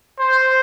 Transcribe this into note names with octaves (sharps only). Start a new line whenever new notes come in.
C5